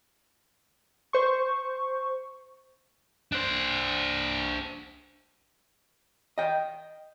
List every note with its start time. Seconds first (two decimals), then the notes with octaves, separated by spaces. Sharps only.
1.13 C5 C#6
3.32 D4 C5
6.38 D#5 G5